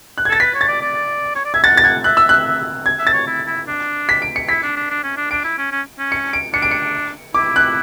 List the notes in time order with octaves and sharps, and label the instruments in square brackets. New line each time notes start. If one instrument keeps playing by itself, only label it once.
[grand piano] F#6
G#6
[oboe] A4 [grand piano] A6
[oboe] B4 [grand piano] B6
[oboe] C#5
[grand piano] A6
[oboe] D5
D5
C#5
D5
[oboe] E5 [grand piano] G#6
[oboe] F#5 [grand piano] A6
[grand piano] A6
[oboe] F#5 [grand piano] G#6
[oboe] E5 [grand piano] F#6
[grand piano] E6
F#6
G#6
[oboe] E5
[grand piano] A6
[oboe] C#5
E4
E4
D4
[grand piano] B6
D7
C#7
[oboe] E4 [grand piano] B6
[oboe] D4
D4
D4
C#4
D4
[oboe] D4 [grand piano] D7
[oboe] E4
C#4
C#4
C#4
[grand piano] C#7
D7
[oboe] D4 [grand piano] C#7
[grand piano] D7
C#7
[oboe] E4 [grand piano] D6
[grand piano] F#6